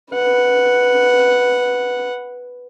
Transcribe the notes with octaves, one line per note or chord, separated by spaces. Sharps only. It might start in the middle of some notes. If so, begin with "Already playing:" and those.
B4 F#5